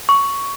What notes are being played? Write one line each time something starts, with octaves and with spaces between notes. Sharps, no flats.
C#6